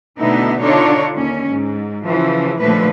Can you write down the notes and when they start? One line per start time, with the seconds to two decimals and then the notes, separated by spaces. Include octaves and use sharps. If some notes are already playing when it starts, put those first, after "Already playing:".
0.18 B2 D3 A3 B3 D#4 E4
0.61 D3 D4 D#4 F4 C#5
1.13 D#2 C#4
1.48 G#2
2.04 C#3 E3 F3
2.60 D#2 A#2 D3 F3 A3 B4